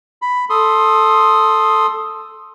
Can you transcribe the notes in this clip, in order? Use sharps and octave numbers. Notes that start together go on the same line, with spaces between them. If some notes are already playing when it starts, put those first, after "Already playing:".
B5
A4 C6 D#6